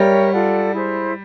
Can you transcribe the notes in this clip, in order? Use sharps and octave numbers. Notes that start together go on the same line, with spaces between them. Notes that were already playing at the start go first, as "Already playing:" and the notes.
Already playing: G3 A#4 C#5 E5 G5
F4 A4 D5 F#5
E4 G#4 C5